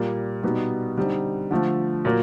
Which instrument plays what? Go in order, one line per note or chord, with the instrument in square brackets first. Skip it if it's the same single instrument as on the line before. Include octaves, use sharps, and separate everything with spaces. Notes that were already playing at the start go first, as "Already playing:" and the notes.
Already playing: [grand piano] A#2 G3 A#3
B2 G3 B3 D#4
D3 G3 C4 D#4
D3 F3 A3
A#2 F#3 A#3